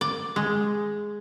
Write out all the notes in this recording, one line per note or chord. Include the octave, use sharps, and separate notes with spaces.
D5
G#3